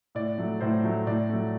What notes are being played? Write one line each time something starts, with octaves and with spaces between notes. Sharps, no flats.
A2 D5
F#3 A3
A2 C5
F#3 A3
A2 D5
F#3 A3